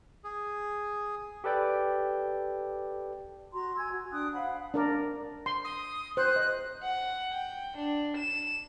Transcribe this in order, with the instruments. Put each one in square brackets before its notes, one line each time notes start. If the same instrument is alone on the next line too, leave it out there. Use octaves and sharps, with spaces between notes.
[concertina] G#4
[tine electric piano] G4 A4 B4 D5 G5
[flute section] F#4 A#5 C6
G#5 E6 G#6
F#4
D4 G5 D#6 F#6
C5 F5 F#5 B5
[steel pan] D4 A#4 D5
C6
[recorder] D#6
[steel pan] C5 [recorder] F#6
[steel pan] D#5
[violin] F#5
G5
D4
E7